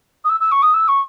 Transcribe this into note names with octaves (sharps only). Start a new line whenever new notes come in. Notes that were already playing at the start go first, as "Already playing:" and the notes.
D#6
E6
E6
C#6
D#6
E6
C#6